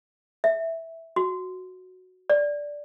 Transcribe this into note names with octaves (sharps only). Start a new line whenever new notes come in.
E5
F#4
D5